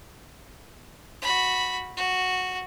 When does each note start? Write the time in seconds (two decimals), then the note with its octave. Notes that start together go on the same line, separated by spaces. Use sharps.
1.22 F#4 B5
1.97 F#4